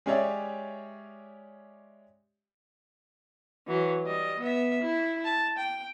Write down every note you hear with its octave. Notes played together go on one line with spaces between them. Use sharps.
G#3 C#4 G4 C#5 D5 E5
E3 F#3
G3 D#5
B3 E5
E4
A5
G5